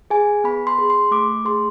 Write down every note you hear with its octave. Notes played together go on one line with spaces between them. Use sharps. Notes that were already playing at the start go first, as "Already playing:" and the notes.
G#4 G#5
B3 B5
C6
G#4
C6
A3 D6
G#4 C6